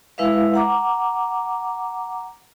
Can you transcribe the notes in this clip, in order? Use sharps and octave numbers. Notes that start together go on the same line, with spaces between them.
G#3 E4 B4 E5 F5
F#5 A#5 D6